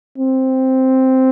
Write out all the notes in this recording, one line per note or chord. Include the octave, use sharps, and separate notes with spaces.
C4